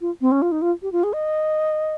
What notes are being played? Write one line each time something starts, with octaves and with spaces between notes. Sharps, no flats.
F4
C4
C#4
F4
D#4
F4
G4
F4
G#4
D#5